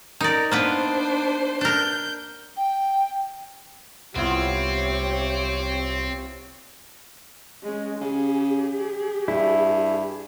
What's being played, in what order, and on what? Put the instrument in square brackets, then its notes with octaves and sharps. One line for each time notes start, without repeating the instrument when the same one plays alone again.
[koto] D#4 D5 [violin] A#4
[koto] A#3 B3 B4 [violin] D4 C5
[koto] D4 A#4 [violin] G6
[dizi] G5
[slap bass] C2 [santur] B3 E4 F4 [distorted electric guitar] C4 [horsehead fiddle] G4 C#5
[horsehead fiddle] G#3 C#4
[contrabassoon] C#3 [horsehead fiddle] G4 G#4
[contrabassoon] G2 [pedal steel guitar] E4